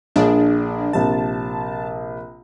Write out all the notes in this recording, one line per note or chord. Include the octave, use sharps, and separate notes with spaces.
A#1 D4 G#4
A#1 C3 A5